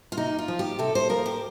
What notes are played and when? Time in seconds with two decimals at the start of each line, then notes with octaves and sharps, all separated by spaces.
0.12 F4
0.17 C3 D#4
0.38 F4
0.48 F3
0.59 G4
0.79 C3 A4
0.95 C5
1.09 F3 A#4
1.26 G4